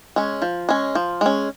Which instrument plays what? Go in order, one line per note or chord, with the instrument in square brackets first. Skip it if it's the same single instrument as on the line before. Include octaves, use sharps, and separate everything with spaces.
[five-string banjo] G#3 C#4
F3
G#3 C#4
F3
G#3 C#4